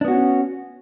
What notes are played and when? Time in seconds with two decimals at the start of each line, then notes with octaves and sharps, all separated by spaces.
0.01 D4
0.05 B3
0.08 F#4
0.11 C#4